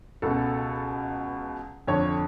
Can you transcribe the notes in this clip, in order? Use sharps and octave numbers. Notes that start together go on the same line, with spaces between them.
C#2 B2 A4
F2 D3 C#5